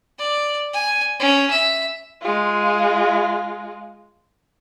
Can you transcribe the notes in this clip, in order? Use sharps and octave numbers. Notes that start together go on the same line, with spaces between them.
D5
G#5
C#4
E5
G#3 F4